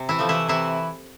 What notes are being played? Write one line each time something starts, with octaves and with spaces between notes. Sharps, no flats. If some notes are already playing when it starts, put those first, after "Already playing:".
Already playing: C3
E3 E4
F3 A3
E3 E4
C3 E3 E4